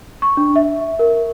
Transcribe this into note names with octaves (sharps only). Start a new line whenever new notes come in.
C#6
D4
E5
A#4